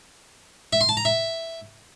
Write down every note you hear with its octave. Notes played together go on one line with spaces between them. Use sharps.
E5
C6
A5
A#5
E5